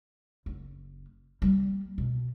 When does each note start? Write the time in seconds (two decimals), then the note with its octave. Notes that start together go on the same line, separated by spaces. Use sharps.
0.46 F#1
1.42 G3 A#3
1.98 B2